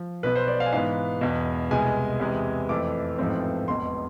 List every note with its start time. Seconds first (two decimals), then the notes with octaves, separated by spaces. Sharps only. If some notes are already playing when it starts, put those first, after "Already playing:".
Already playing: F3
0.23 B1 B2 B3 B4
0.35 C5
0.48 D5
0.60 F5
0.66 G#5
0.72 G#2 E3 B3 F5
1.21 E1 E2 B2
1.71 C2 B2 G#3 G#5
2.20 E2 C3 G#3
2.69 F2 E3 A3 D6
3.19 A1 G#2 F3 A3 C4
3.68 E1 E2 B2 C6